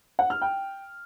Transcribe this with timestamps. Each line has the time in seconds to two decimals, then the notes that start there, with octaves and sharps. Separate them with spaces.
0.19 F#5
0.30 F6
0.42 G5